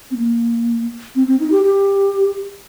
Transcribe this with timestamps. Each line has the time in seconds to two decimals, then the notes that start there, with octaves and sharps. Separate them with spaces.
0.11 C4
0.17 A#3
1.15 C4
1.27 C4
1.39 D#4
1.52 G4
1.63 G4